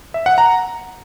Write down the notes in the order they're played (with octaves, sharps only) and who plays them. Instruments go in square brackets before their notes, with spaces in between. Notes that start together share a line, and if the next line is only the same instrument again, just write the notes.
[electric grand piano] E5
F#5
A#5